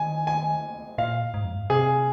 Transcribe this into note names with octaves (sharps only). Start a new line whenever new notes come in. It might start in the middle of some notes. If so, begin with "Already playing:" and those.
Already playing: D#3 G#5
G#5
A#2 F5
G#2
F2
G#2
C3 G#4